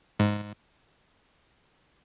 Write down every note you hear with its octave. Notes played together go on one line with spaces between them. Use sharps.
G#2